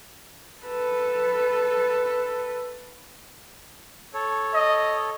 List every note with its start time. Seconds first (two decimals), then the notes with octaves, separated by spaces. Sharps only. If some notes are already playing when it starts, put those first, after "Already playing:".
0.62 A4 B4
4.14 A4 C#5
4.54 D#5